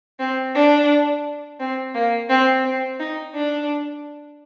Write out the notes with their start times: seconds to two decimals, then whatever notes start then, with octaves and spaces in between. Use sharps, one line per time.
0.20 C4
0.55 D4
1.60 C4
1.94 A#3
2.29 C4
2.64 C4
2.99 D#4
3.35 D4